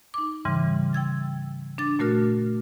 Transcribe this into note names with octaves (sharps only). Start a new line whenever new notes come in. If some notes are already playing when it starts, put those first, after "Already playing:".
D#4 D6
G#2 C#3 E3 G3
G5 E6 G#6 A6
D4 D6 A6
A#2 A3 F#4 A#4 F6